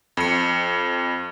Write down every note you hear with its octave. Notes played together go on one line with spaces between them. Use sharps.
F2 C#7